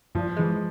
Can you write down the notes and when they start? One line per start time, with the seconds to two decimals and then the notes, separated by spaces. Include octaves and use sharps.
0.15 G2 F3
0.37 E3 G#3